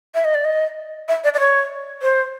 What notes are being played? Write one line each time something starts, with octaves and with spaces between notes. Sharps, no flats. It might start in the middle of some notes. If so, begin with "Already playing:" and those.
E5
D#5
D5
D#5
E5
D5
D5
C#5
C5